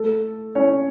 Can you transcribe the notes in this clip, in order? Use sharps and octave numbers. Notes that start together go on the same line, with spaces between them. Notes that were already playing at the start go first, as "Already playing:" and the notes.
Already playing: A3 A4
C#4 C#5